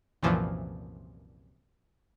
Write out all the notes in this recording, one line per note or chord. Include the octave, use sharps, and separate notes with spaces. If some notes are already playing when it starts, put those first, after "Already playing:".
C2 F#2 A#2 E3 F3